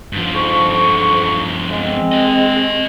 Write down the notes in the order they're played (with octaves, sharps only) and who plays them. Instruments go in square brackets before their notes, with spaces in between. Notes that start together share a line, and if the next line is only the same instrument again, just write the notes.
[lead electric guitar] G2 F3
[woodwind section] F2 G#2 C#6
G#3 C4
[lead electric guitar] G4 D#5